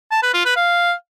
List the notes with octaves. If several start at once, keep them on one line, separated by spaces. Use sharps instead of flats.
A5
B4
F4
B4
F5